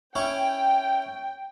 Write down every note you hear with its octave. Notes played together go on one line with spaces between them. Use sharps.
C#4 E4 G5 C#6